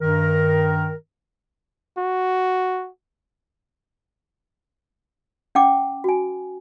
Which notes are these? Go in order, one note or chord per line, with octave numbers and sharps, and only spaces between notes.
G2 D#3 A#4
F#4
C#4 F#5 G5 D6
F#4 G#5